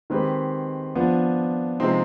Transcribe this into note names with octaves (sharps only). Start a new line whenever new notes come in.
D#3 G#3 C4 G4 B4
F3 B3 D4
C3 F3 G#3 C4 D#4